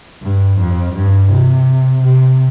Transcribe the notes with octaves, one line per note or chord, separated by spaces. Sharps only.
G2
F2
G2
C3
C3